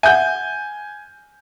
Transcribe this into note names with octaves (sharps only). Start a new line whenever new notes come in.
E5 F#5 G#5 G6